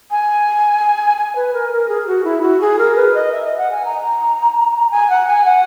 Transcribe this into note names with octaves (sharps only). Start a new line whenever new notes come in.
G#5
G#5
B4
A#4
A#4
G#4
F#4
E4
F#4
G#4
A#4
B4
D#5
E5
D#5
F#5
G#5
A#5
G#5
F#5
G#5
F#5